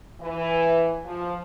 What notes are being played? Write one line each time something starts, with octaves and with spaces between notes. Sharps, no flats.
E3
F3